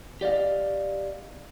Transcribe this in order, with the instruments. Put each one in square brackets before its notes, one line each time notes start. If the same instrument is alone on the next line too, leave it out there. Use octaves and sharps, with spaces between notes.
[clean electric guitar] G4 D5 D#5 F5